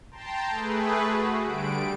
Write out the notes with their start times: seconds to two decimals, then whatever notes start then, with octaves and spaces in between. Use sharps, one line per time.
0.11 G5 A5 A#5 C6
0.50 A3 G#4 B4
1.08 F#4
1.44 D3 G3 D7